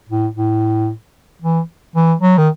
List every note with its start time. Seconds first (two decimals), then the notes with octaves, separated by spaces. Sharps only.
0.09 A2
0.35 A2
1.42 E3
1.96 E3
2.22 F#3
2.38 D#3